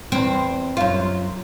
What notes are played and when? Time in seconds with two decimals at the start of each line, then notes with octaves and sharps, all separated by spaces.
0.12 E2 C4
0.77 F#2 F4